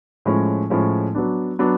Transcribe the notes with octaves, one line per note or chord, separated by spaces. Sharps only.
A2 F3 G#3 C#4
A2 F3 G#3 C#4
F#3 B3 D4
F#3 B3 D4